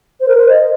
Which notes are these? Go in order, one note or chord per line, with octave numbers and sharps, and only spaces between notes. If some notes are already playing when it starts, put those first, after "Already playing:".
C5
A#4
C5
D#5